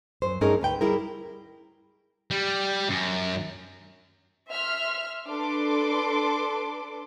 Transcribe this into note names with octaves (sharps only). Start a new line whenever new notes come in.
F#2 C5
G2 A3 C#4 D#4 G#4 A#4
D2 B4 G5
G3 E4 G#4 A#4
G3
F#2
E5 C6 F6
D4 A4 B4 C6 D6